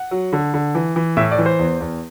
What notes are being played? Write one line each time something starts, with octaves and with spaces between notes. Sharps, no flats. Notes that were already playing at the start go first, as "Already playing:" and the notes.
Already playing: F#5
F#3
D3
D3
E3
E3
A2 E5
D5
E3
C5
E2
E2